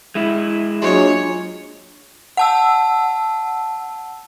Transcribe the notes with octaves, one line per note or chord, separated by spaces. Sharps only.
G#3 E4
F#3 G#3 A#3 D4 F4 C#5
F#5 A5 E6